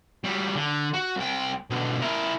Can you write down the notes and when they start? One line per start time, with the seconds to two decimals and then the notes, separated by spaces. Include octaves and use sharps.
0.24 F#3 G3
0.56 D3
0.94 F#4
1.17 C2 G5
1.70 B2 D3
2.01 E4 A#4